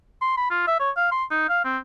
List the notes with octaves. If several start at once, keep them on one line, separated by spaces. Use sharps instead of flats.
C6
B5
F4
E5
C#5
F5
C6
D#4
F5
C4